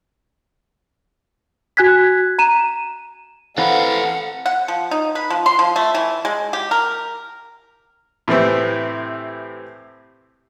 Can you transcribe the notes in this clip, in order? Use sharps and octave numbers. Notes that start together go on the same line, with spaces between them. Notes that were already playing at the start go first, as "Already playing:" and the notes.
F#4 G#5 F#6 G#6 B6
A#5 D#7 E7
E3 C4 A4 B4 F5 F#5
F#5
F3
D#4
B4
F3
C6
F3
A3
E3
G#3
G4
A#4
A2 C3 E3 C4